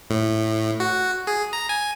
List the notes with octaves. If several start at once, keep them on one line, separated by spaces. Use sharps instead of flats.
A2
F#4
G#4
A#5
G#5